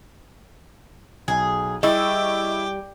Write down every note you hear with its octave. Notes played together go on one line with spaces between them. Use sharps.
B1 G#4
G3 E4 G#4 D#5 G5 C#6 D6 E6